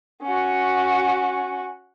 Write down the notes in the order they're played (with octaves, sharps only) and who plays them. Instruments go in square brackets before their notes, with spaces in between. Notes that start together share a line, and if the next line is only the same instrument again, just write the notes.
[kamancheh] C#4 F#4